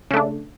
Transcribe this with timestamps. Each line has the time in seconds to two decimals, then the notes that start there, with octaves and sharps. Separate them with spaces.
0.11 C#3
0.14 A3
0.17 D4